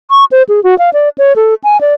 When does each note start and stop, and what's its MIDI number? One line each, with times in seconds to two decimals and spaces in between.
0.10 0.25 85
0.32 0.43 72
0.49 0.63 68
0.64 0.77 66
0.79 0.90 77
0.93 1.09 74
1.18 1.33 73
1.36 1.54 69
1.64 1.80 80
1.81 1.94 74